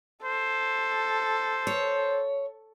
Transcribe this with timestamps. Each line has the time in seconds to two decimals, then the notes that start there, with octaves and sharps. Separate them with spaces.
0.24 A4 C5
1.67 C#5